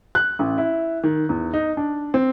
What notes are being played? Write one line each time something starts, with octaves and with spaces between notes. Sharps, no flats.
F#6
A1
E4
D#3
E2
D#4
D4
C4